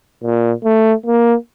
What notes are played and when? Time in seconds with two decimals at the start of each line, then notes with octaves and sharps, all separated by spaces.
0.24 A#2
0.64 A3
1.06 A#3